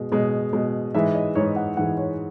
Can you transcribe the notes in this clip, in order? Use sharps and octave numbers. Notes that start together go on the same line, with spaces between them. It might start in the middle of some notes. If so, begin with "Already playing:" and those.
Already playing: B2 G#3
B2 G#3
B2 G#3
G#2 E3 G#3 E5
D#5
G#2 E3 G#3 C#5
F#5
G#2 E3 G#3 F#5
C#5